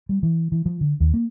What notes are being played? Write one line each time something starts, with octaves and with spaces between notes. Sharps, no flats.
G3
E3
E3
F3
D3
D#2
A#3